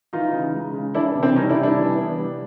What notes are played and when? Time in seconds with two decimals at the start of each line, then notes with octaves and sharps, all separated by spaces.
0.13 E3 D#4 F4
0.33 C#3
0.54 G#3
0.74 C#3
0.94 E3 D4 E4
1.16 C3
1.22 C4 D4
1.36 G3 C#4 D#4
1.49 D4 E4
1.57 C3
1.63 D4 E4
1.77 E3
1.98 B3
2.19 G3